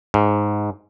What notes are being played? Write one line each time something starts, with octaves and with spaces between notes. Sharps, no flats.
G#2